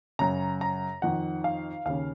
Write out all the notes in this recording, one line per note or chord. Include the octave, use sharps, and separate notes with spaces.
F#2 C#3 A#5
A#5
F2 D#3 F#5
F5
D#2 C#3 F5